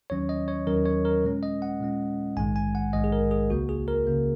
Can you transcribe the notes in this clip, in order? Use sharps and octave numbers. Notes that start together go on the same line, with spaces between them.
D#2 D#3 F#3 C#4 C#5
D#5
C#5
D#2 D#3 F#3 C#4 A#4
C#5
A#4
A#2 G#3 C#4
D#5
F#5
A#2 G#3 C#4
A#1 G#2 D#3 G#3 G#5
G#5
F#5
A#1 G#2 D#3 G#3 D#5
G#4
A#4
G#4
C#2 C#3 A#3 F#4
G#4
A#4
C#3 A#3